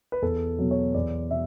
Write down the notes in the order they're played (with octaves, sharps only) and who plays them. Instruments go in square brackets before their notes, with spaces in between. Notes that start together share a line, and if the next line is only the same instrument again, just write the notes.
[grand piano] B4
E2 A4
B2 F#3
C#5
E2 D5
B2 E5